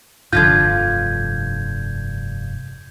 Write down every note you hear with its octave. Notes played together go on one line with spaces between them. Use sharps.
F1 G2 D3 F3 F4 G6 G#6